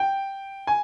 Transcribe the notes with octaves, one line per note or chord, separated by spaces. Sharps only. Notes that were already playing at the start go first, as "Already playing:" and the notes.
Already playing: G5
G#5